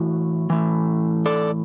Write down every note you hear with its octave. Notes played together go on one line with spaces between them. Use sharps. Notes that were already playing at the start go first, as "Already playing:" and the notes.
Already playing: A2 E3 F#4
A2 E3
A4 D5